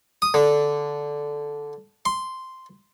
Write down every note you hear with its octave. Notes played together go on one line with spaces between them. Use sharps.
D#6
D3
C6